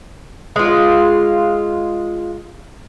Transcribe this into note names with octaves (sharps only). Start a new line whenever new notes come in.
G#3 F4